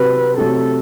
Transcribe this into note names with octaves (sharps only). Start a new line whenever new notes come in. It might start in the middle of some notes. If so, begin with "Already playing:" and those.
Already playing: C3 F#3 C4 F#4 B4
C3 F#3 A3 A4